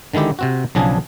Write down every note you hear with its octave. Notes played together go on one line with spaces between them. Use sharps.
D3 D#3 G#3 E4 G4
C3 C4 F#4
B1 C#3 F3 D4 G#4 G#5